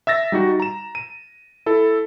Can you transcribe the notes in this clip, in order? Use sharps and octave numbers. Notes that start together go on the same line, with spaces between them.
E5 E6 A6 A#6
G3 D#4 F#4
A#5 E7
D#7
E4 A4